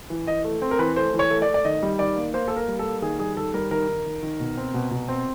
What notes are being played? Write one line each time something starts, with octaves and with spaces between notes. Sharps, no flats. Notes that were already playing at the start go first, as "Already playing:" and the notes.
E3
E3 D#5
A3
C4
A#4
E3 B4
A3 C5
E3
C#5
A3
D5
A3
D5
D#3 D#5
G3
D#3 D5
A#3
A#3 C5
A#3 A4
A#4
G3
A4
A#3
D#3 G#4
G3 G#4
D#3 A4
G3 A#4
D#3 A#4
D#3
D#3
D#3
B2
C4
B2
B2
C4